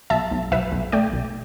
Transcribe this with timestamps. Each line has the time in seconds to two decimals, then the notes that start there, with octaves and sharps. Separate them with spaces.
0.10 B1 E5 A5
0.31 B1
0.52 B1 B4 E5
0.72 B1
0.92 A3 D5 G5
1.13 B1